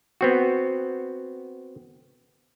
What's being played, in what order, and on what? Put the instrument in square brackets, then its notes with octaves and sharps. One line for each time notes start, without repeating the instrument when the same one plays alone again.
[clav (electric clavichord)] B3 C4 F#4